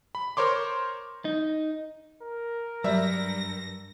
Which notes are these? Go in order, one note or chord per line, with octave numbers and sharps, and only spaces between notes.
B5
A#4 C5 C#5 C6 D6
D#4
A#4
G2 F#3 G3 E5 A#6